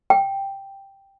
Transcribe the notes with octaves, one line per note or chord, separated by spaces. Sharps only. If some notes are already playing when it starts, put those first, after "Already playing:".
G5